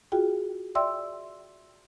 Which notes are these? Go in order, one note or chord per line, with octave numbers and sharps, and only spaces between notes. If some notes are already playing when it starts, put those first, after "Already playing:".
F4 F#4 G#4 G5
D5 E5 G5 C6 E6